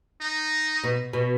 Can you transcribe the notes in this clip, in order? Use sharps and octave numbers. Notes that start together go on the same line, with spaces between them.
D#4
B2
B2